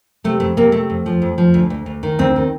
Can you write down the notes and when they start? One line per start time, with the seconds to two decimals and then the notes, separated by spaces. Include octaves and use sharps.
0.24 C3 A3
0.40 F2 A3
0.57 C3 A#3
0.72 C3 A3
0.90 F2
1.06 F3
1.22 F2
1.38 F3
1.54 D2
1.70 D2
1.86 D2
2.03 D#3
2.19 D2 C4
2.36 D#3